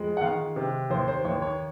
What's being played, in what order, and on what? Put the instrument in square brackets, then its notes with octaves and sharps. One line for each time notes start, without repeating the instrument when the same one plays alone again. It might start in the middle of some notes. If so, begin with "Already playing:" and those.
Already playing: [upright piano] F2 G#3
F#5
D#3 F5
C3
D#2 C5
C5
D#2 C#5
C#5